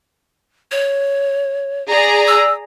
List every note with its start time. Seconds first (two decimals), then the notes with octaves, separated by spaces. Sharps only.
0.71 C#5
1.89 G#4 D5 A#5
2.27 E6